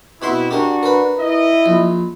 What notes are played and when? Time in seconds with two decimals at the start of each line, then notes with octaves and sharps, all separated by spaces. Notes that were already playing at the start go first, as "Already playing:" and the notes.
0.22 B2 C4 E4 F#4 C6
0.51 D4 F#4 G4 A#4
0.83 A#4 B4
1.18 E4 D#5
1.66 A#1